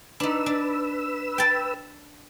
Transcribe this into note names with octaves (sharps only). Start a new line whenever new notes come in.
D4 D#4 B4 E6
D4
G5 A5